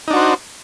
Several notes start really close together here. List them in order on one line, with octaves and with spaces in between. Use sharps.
D#4 D4 F#4 C5